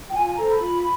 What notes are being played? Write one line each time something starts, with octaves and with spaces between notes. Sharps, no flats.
G5
F4 G#5
G#5
A4 C5 A#5
B5
F4